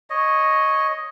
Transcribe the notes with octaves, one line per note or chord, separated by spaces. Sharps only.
C#5 D#5